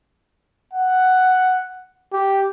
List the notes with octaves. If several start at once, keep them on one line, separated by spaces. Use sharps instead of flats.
F#5
G4